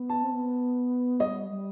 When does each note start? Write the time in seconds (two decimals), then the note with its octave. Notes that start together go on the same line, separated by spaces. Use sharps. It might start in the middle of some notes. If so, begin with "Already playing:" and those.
Already playing: B3
0.09 A5
0.23 C4
0.31 B3
1.20 G3 D#5
1.50 G3